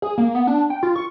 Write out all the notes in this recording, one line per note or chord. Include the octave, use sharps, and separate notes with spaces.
G#4
A#3
B3
D4
G5
F4
C#6